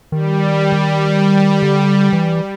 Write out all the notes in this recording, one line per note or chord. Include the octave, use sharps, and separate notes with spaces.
D#3 G3
D#3
D3
E3